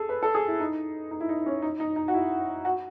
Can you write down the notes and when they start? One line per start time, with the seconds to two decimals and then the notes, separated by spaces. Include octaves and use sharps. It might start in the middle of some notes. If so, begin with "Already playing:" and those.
Already playing: G#4 A4
0.09 B4
0.23 A4
0.35 G#4
0.48 E4
0.60 D#4
1.11 D#4
1.20 E4
1.29 D#4
1.46 C#4
1.62 D#4
1.80 D#4
1.96 D#4
2.08 F#4
2.14 E4
2.65 F#4